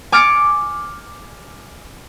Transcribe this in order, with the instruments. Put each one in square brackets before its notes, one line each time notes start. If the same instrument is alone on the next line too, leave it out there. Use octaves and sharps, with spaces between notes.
[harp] G#5 D6 F6 A6 C#7 D7